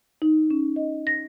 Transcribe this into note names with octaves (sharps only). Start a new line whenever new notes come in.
D#4
C#4
D#5
A#6